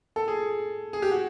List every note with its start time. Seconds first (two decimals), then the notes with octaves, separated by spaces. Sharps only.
0.16 A4
0.28 G#4
0.93 G#4
1.02 G4
1.11 F#4